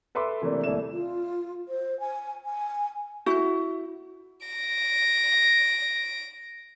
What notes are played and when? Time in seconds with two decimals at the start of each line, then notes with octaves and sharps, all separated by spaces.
0.15 A4 B4 E5 C6 D6
0.42 C3 E3 A3 A#3 D4
0.64 D#1 A3 D4 E4 E7
0.92 F4
1.68 C5
2.00 G#5
2.45 G#5
3.26 E4 F#4
4.46 A#6 D7